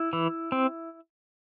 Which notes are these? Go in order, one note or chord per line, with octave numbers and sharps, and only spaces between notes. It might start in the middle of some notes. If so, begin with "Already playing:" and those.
Already playing: E4
E3
C4